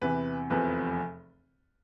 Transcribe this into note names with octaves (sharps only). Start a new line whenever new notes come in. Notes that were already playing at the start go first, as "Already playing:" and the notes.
E2 C3 E3 B4
F1 E2 C3 F3 B4